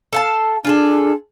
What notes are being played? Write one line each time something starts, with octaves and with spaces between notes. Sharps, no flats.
A4 F5 A5
D4 F4 G#4 A4